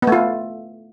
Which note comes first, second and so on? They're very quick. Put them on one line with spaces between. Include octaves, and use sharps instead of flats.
B3 A3 F4